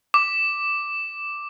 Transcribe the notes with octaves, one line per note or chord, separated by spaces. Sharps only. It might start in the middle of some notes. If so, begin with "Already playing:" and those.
D6